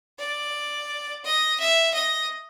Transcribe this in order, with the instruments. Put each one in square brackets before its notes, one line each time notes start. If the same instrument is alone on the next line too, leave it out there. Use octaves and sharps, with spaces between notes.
[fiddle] D5
D#5
E5
D#5